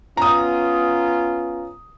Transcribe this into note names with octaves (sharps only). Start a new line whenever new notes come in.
B3 C#4 F4 A#5 D#6